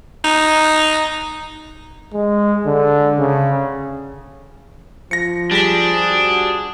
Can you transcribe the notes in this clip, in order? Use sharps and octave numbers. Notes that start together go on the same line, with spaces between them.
D#4
G#3
D3
C#3
F3 A#6 C#7
G3 D4 G#4 B6
F#4